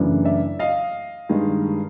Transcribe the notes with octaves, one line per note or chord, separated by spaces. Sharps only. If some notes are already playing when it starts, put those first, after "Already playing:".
Already playing: F#2 C#3 E3 A3 D4
D5 E5
D#5 F5
G2 D#3 G#3